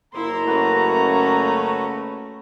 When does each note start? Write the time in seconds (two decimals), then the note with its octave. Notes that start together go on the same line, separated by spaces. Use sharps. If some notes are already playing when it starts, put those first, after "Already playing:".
0.14 F#1 A#3 E4 A#5 C6
0.47 A3 C#4 F#4 B4